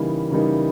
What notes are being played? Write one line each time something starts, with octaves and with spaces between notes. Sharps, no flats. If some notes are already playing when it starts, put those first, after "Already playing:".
Already playing: C#3 E3 G3 A#3 D#4
C#3 E3 G3 A#3 D#4